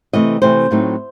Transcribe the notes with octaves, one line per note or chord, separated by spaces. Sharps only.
C3 E3 A3 C4 D#5
C3 E3 A3 C4 C5
A2 F#3 A3 C4 D#4